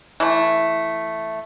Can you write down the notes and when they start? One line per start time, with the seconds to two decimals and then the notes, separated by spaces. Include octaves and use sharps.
0.20 E3 A3